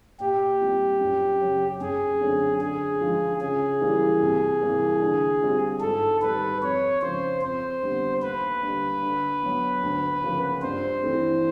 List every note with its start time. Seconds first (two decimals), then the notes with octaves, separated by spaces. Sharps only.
0.20 A#2 G4
0.61 G3 C4 F4
1.01 F#2
1.41 C#3 F#3
1.81 F#2 G#4
2.20 D3 F#3 A3 C4
2.61 D3 G#4
3.01 F3 G#3
3.40 C#3 G#4
3.81 E3 G3 A#3
4.22 C2
4.61 C3 E3 G3 A#3
5.02 D3
5.42 G3 C4 F4
5.81 G#2 A4
6.21 D#3 G3 B4
6.62 F2 C#5
7.02 C#3 F3 G#3 C5
7.42 F2 C5
7.82 D3 G3 B3
8.22 D#2 B4
8.62 D3 G3
9.02 D3
9.42 F#3 B3
9.83 D2
10.22 C#3 F3 A#3
10.62 G2 C5
11.03 E3 A3 C4